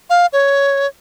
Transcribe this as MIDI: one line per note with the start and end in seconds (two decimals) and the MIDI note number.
0.10 0.26 77
0.33 0.87 73